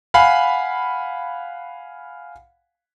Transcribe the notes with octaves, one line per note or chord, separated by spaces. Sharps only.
F5 F#5 G#5 B5